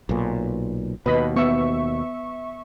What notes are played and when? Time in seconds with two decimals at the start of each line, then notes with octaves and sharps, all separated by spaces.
0.09 B1 A#2
1.06 D#2 B2 B4 D#5 B5
1.36 B3 E5 C#6